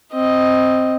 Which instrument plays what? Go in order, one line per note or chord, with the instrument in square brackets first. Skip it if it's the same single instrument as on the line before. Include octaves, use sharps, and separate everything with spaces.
[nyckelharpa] C4 D#5